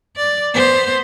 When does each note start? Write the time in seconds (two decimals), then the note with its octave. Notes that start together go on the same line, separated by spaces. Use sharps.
0.17 D5
0.54 B3 C5